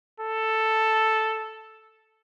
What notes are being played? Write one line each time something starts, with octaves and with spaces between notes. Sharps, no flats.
A4